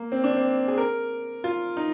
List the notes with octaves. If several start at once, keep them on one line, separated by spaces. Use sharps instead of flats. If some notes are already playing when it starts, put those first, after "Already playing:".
Already playing: A#3
C4
D4
C4
G#4
A#4
F4
D#4